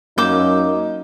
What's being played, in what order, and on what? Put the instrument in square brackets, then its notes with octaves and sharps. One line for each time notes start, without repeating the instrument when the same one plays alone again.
[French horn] F#2 [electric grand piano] A#3 [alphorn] D#4 [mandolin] D6 E6 G6